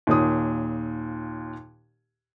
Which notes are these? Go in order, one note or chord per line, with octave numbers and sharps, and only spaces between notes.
D#2 A#2 C#5 D#6